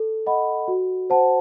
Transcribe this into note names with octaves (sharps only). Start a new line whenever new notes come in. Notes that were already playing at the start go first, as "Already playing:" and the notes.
Already playing: A4
D#5 F#5 B5
F#4
C5 F#5 A5